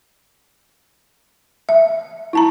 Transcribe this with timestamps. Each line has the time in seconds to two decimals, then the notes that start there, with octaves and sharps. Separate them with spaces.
1.69 E5
2.33 E4 A5 A#5